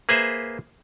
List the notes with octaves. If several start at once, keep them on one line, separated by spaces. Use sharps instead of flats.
A#3 G#4 B4 C5 E5